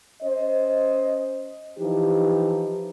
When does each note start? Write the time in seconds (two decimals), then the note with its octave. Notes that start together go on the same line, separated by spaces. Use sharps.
0.23 C#4 C5 D#5
1.79 E3 F3 D#4 G4